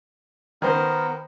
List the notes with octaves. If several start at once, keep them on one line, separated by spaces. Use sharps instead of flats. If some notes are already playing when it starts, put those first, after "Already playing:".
D#3 B3 A#4 C5